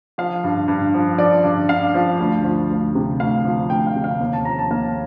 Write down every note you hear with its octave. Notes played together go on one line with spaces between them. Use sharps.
F3 F5
G2
G2
F3
F3 D5
G2
G2 F5
F3
D2
F3
D2
C3
D2 F5
F3
D2 G5
F5
C3
F5
D#2
A5
F3 A#5
A5
D#2 F5